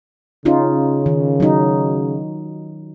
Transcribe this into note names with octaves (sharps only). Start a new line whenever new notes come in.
C#3 C#4 D#4 F4
D#3
F#3 D#4